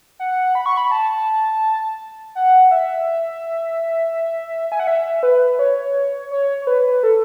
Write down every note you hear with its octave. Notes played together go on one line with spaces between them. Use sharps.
F#5
B5
C#6
B5
A5
F#5
E5
G#5
F#5
E5
B4
C#5
C#5
C#5
B4
A4